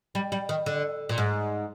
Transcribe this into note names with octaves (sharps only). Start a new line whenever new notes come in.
G3
G3
D#3
D3
A#2
G#2